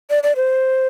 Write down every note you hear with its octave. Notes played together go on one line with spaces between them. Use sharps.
D5
D5
C5